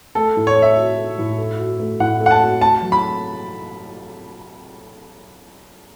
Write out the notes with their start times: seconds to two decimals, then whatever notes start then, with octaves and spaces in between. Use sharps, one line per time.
0.15 A3 A4
0.36 A2
0.47 C#5
0.56 A4
0.62 E5
0.77 F#4
0.98 A3
1.18 A2
1.38 A4
1.59 F#4
1.80 A3
2.00 A2 F#5
2.20 A4
2.26 F#5
2.31 A5
2.41 F#4
2.61 A3 A5
2.82 F#3
2.92 B5